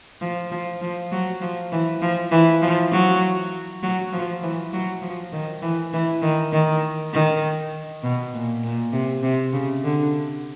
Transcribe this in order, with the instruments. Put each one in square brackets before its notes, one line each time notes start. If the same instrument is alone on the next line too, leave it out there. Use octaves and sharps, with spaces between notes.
[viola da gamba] F3
F3
F3
F#3
F3
E3
F3
E3
F3
F#3
F#3
F3
E3
F#3
F3
D#3
E3
E3
D#3
D#3
D#3
B2
A#2
A#2
C3
C3
C#3
D3